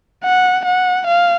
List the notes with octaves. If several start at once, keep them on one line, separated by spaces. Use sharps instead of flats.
F#5
F#5
F5